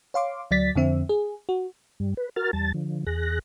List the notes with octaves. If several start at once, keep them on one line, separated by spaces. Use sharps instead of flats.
C#5 F5 C6 D6
D2 F#3 D5 A6 B6
F2 D3 C4 E5
G#4
F#4
G2 G3
B4
F#4 A#4 F6 A6
E2 G3 A5 A6
D3 F3
E2 G#4 F#6 A#6